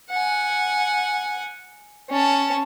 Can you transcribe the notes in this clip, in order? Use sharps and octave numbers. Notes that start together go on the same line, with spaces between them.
F#5 G#5
C#4 A5